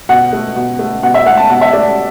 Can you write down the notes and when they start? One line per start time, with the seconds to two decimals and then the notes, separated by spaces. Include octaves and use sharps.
0.09 B2 F#5
0.33 A3
0.56 B2
0.79 A3
1.03 B2 F#5
1.14 E5
1.26 A3 F#5
1.37 A5
1.49 B2 F#5
1.61 E5
1.73 A3 D5